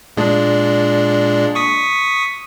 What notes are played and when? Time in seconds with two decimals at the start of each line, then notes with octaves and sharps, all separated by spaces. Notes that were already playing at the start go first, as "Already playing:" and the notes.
0.17 A#2 G#3 D4
1.55 C#6 D#6 B6